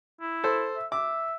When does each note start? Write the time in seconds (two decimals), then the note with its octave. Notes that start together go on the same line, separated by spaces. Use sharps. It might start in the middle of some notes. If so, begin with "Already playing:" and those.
0.21 E4
0.44 A4 C5
0.76 E5
0.92 E5 D6